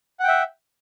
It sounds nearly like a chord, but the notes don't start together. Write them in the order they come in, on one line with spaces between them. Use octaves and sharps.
F#5 G5 E5